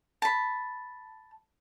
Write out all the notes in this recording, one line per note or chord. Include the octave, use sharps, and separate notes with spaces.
A5 B5